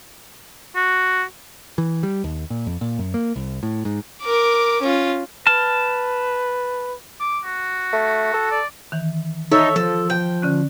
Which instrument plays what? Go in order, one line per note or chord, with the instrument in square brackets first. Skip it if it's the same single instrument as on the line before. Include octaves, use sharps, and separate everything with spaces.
[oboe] F#4
[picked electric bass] E3
G3
D#2
A#2
F2
A#2
F#2
A#3
C2
A2
G#2
[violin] A#4 D6
C#4 F4
[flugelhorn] B4 [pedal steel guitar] A5 F6
[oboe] D6
F#4
[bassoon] A3
A4
[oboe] D5
[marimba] D#3 E3
[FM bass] D#4 [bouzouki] A4 C#5 E5
[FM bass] F3 [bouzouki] A4
[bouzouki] G5
[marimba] D3 C#4 F#6